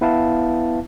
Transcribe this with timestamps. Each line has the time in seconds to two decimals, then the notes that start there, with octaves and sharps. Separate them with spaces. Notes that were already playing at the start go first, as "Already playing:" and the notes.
0.01 B3 E4 B4 E5 F5 A5